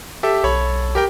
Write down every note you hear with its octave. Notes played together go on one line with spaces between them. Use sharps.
G4 A4 E5
B1 A4 C#5 B5
G4 A#4 G5